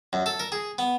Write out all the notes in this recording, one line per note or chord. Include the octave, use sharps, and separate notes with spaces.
F#2
A4
A#4
G#4
B3